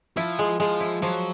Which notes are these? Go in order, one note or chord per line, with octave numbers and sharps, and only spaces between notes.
F3 E4
G#3
F3 G#3
E4
F3 F#3